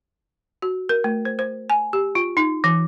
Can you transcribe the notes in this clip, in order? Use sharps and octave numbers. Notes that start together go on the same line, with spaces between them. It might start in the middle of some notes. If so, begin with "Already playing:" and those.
F#4
A#4
A3
C5
C5
G#5
G4
F4
D#4
E3